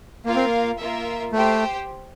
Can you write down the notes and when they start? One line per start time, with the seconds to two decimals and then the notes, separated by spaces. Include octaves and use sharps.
0.25 A#3 F4 A#4 F5
0.35 C4
0.46 A#3
0.78 A#3 F4 A#4 E5
1.32 A3 G4 C5 G5